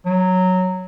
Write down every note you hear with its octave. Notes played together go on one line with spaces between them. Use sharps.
F#3